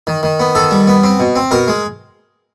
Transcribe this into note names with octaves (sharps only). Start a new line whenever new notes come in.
D#3
D#3
B3
D#3 A4
G3
B3
C4
B2
C4
B2 A#4
G#3